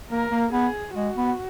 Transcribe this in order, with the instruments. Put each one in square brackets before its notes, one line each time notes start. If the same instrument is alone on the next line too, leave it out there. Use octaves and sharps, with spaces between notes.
[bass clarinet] A#3 [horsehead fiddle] A#4
[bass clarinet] A#3
[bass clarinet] B3 [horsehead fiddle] G#4
[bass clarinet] G#3 [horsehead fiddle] F#4
[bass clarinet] B3